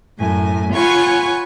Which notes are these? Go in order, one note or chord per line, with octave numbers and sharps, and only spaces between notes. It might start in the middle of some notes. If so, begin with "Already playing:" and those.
F#2 A2 G#5
F4 C#5 F#5 G#5 B5 C#6